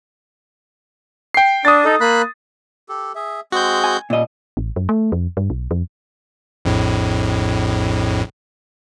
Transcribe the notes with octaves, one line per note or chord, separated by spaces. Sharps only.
G5 C7
D4 D#6 A6
D#4 A4
A#3 B5 F#6
G4 A4
G#4 E5
G#3 C4 F#4 G#4 G6
G#5
A#2 D#5
A1
F#2
A3
F2
G2
B1
F2
A#1 F2 A2